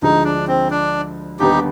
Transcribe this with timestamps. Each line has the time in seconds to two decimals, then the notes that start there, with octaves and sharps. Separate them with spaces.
0.02 D2 D3 F3 G#3 D#4
0.24 D4
0.48 C4
0.71 D4
1.39 D#2 D3 G3 B3 D#4 G4